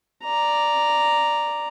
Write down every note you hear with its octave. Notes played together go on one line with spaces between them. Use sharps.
D5 A#5